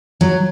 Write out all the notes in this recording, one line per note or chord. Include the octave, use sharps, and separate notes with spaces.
F#3